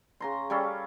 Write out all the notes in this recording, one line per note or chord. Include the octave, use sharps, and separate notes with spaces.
C#3 A#5 C6
G3 C#4 A4 F5